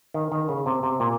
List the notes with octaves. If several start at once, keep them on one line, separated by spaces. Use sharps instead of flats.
D#3
D#3
C#3
C3
C3
A#2